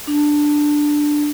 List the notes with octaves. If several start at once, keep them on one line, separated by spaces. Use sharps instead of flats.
D4